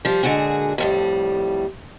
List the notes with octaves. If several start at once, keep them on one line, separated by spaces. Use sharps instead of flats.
F3 G3
A#2 D3 G#3 F#4 G#4
F2 A2 G3